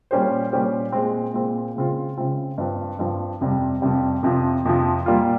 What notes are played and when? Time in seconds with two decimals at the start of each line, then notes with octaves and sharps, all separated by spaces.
0.11 A#2 G3 C#4 G4 C5
0.52 A#2 G3 C#4 G4 C5
0.92 A#2 G#3 C4
1.34 A#2 G#3 C4
1.76 C#3 G#3 C4 F4
2.18 C#3 G#3 C4 F4
2.58 G2 F3 C4
2.99 G2 F3 C4
3.41 F2 C3 G3
3.82 F2 C3 G3
4.23 F2 C3 F3
4.65 F2 C3 F3
5.06 A#2 G3 A#3 F4